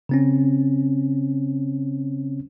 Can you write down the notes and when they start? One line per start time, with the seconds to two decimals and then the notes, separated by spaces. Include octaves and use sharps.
0.09 C#3 C4 C#4